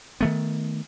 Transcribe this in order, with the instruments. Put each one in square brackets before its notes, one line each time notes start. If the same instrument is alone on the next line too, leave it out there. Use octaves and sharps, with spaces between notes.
[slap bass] D#3 A3 B3